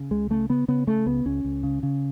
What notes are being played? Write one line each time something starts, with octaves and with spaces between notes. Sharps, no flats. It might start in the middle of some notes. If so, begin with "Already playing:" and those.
Already playing: C#3
C#2 G#3
C#3 A3
C#3 B3
C#3 B3
C#3 A3
C#2 B3
C#2 C#4
C#2
C#3
C#3